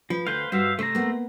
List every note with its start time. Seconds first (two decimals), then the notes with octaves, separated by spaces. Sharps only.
0.10 F3 B4
0.27 D2 B4 C5 F5
0.52 G2 G3 F#4 C5 E5 F5
0.79 C3 A3 C5 A#5
0.95 A#3 B3